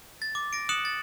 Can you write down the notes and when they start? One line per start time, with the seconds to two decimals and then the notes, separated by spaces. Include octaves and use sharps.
0.22 A6
0.35 D6
0.53 A#6 D7
0.69 D#6 F#6 C#7 E7 F#7
0.85 A6